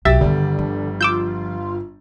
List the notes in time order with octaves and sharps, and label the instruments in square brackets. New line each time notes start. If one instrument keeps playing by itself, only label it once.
[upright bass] B1 [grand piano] F#3 G4 A6 [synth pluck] E5
[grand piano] G1 G3 [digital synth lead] D3 [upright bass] D#3 B3
[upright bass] F3
[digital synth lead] F4 [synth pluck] D6 E6 G6